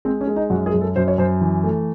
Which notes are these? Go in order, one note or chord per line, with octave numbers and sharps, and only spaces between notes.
G#3 C4
C#4
G#3
D#4
F#2 F#4
G#4
F#2
A4
F#2 C5
C#5
F#2 C5
E3
A3